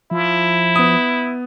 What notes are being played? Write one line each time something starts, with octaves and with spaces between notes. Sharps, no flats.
F3 E4
B3 D#6